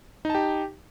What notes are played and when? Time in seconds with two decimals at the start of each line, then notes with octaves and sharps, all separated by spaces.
0.25 D#4
0.30 A5
0.35 G4